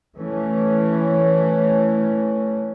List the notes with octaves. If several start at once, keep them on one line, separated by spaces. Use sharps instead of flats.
E3 A3 C#4